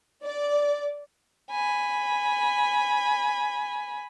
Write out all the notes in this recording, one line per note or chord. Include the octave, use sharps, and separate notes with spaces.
D5
G#5 B5